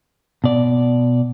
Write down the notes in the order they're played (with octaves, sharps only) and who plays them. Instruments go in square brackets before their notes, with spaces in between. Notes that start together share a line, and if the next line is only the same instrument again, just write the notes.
[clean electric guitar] B2 D5